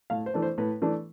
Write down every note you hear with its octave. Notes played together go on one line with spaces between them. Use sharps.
A2 F5
C5
E3 A3 D4
C5
A2 B4
E3 A3 D4